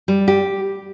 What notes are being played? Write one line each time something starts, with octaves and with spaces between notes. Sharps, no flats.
G3
G4